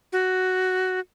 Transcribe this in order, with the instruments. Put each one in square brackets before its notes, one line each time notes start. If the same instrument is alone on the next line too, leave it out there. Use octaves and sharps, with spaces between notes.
[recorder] F#4